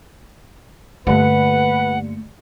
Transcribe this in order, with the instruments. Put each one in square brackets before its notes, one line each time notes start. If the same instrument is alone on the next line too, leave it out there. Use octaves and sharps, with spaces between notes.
[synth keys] G2 D3 C#7 [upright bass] A3 A#3 [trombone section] B4 [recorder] F#5